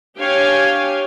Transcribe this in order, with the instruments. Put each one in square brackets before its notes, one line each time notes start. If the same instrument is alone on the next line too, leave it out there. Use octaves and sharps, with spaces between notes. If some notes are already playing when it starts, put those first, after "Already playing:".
[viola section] D4 G4 C#5 F5 G5 G#5